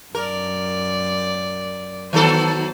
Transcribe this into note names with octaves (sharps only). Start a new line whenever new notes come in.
F#2 A#4 D5
D#3 F#3 B3 A4 C5